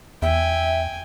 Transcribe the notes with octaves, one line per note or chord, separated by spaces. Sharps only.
E2 E5 G5 G#5